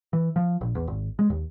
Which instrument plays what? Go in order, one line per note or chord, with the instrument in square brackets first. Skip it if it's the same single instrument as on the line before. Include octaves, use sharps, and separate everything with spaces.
[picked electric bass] E3
F3
A#1
E2
G#1
G#3
D#2